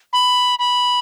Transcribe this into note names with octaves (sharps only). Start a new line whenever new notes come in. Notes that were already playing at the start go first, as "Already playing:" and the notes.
B5
B5